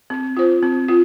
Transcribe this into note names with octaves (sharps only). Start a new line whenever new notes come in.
C4
F4 C5
C4
F4